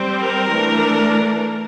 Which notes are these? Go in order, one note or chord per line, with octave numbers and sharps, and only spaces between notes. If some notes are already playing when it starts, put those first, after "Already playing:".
Already playing: G3 C4
A#4
E3 A3 D4